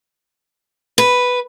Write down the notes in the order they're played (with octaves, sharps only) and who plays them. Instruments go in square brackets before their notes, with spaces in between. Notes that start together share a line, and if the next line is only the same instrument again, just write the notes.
[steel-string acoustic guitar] B4